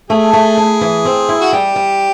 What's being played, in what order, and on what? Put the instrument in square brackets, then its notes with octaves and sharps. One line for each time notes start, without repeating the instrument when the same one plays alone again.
[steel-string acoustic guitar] A3 [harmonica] G#4
[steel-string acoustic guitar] A3
E4
E3
C4
E4
[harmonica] F#4
[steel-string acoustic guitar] G3 [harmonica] G4
[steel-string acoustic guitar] G3